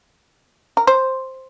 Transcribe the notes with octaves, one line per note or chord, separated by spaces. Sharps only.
A#4
C5